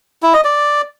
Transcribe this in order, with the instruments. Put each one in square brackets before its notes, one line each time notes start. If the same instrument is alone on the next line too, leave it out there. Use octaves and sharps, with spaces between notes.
[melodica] E4
D#5
D5